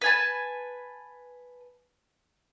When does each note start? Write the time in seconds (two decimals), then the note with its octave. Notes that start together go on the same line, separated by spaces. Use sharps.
0.01 B4 G#5 A5